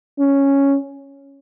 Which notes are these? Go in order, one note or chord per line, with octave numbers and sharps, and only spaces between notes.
C#4